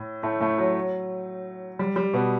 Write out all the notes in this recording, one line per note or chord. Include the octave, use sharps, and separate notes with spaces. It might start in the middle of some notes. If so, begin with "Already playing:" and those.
Already playing: A2
A2 A3
A2 A3
F#3
G3
G3
B2 B3